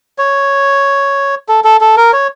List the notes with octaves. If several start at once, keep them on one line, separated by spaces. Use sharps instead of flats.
C#5
A4
A4
A4
A#4
C#5